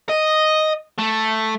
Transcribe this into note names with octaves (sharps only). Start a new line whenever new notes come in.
D#5
A3